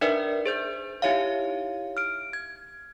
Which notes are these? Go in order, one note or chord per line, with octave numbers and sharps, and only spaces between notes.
D4 D#4 A#4 B4 D5 E5
G#4 C5 G6
D#4 E4 G4 C#5 E5 F5
F6 D7
G#6